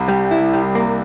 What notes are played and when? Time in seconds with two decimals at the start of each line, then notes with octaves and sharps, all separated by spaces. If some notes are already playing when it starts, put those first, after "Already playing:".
Already playing: C2 C3
0.08 G3
0.31 E4
0.53 G3
0.75 A#3